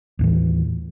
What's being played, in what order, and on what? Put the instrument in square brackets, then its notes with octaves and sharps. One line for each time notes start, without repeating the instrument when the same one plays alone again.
[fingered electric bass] D#2 A2 E3